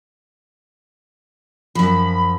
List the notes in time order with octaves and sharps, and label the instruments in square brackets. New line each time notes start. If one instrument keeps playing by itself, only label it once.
[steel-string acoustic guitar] F#2 F3 [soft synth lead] B5